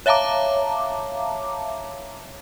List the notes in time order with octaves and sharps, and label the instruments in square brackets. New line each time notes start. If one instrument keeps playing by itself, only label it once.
[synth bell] C#5 E5 F5 A5 A#5 D6